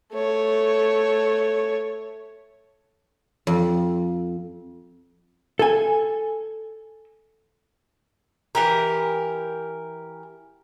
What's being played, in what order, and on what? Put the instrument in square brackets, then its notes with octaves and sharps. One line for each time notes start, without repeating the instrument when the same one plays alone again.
[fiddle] A3 C#5
[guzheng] F2
[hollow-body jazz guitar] A4 G#5
[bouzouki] E3 G4 A#4